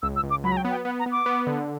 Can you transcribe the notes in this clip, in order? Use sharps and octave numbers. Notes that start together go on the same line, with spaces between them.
C#2 E6
E6
C#2
D6
F#3 B5
A#5
G5
B3
G5
B3 F#5
A#5
B3
D6
B3
D3